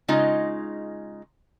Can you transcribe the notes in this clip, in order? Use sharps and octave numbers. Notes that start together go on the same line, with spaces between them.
C#3 G#3 D#4 F4 D#5